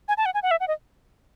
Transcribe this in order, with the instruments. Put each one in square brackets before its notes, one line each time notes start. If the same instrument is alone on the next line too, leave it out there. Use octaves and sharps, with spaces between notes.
[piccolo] G#5
A5
F#5
G#5
F#5
E5
F#5
D#5